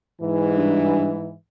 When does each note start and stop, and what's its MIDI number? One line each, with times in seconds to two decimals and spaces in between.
0.21 1.32 44
0.21 1.32 52
0.57 1.12 43